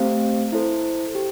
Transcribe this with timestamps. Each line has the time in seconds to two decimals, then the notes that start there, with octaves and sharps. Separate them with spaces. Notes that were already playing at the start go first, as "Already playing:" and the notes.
Already playing: A3 C4 G4 C5 F5
0.52 E4 A4 C5
1.15 G4